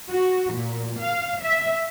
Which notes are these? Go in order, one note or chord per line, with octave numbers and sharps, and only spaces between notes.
F#4
A#2
F5
E5